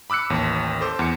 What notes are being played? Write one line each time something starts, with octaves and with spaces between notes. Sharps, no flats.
B5 D6 E6 F#6 C#7
A1 D#2
A4 C5 D6
E2 C#7